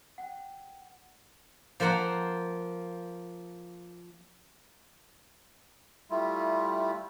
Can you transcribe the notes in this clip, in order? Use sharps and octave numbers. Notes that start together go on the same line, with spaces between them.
F#5 G5
F3 A#3 C5 F#5 A#5
G3 A3 E4 F4